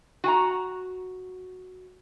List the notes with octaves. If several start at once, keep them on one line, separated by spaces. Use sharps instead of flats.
F#4 G#5 A#5